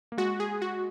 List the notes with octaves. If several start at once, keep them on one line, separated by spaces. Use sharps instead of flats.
A#3
G#3 F#4
G#4
F#4